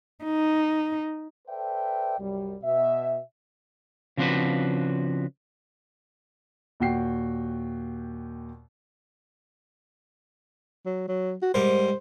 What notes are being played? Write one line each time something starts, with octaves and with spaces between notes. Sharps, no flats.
D#4
A4 B4 C5 D5 E5 G5
C2 F#2 G3
B2 E5
C#3 F3 C4 D4 F#4 B4
D#2 A#2 F#4 G5 C7
F#3
F#3
F#4
G#2 G3 A#4 C5